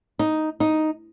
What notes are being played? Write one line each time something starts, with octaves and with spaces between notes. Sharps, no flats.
D#4
D#4